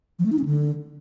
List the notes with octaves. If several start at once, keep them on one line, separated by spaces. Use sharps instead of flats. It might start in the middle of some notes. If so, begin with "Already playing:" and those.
F3
A3
D#4
C#4
D3